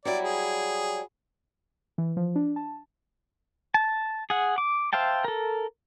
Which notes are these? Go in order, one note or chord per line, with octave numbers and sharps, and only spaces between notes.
F#3 G3 E4 D5
G#4
E3
F3
D4
A5
A5
G#4 F#5
D6
C5 E5 F5 G5 A5
A4 A#4